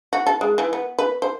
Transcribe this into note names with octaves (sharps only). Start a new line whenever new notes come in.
F#4
A4
G#3
E3
B3
B4
C5